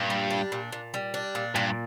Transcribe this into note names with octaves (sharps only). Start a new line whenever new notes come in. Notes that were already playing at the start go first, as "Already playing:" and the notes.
Already playing: G2 A#2
G3
D4
A#2
A#2
G3
D4
A#2
G2 A#2